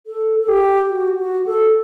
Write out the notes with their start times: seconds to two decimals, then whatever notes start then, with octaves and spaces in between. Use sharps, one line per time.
0.07 A4
0.40 A4
0.48 G4
0.90 F#4
1.19 F#4
1.46 A4